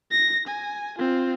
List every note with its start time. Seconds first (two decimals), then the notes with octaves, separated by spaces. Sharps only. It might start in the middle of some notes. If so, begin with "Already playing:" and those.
0.11 A#6
0.47 G#5
0.98 C4 F4